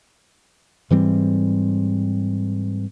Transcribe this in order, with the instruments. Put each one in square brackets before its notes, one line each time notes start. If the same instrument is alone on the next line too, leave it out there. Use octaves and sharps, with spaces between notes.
[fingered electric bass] G#2 E3 G3 C4